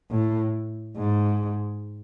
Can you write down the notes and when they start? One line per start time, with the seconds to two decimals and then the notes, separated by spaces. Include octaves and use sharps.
0.11 A2
0.96 G#2